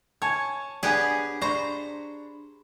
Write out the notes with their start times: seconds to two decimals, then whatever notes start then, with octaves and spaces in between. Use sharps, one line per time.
0.22 C#5 G#5 A5 G#6
0.83 B3 D4 G4 G#4 G#5
1.41 D4 C5 A#5 B5 C#6